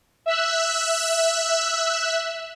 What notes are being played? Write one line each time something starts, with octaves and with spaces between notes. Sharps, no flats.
E5 E6 F#6